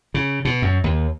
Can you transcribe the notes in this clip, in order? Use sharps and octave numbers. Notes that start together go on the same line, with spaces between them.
C#3
B2
F#2
D#2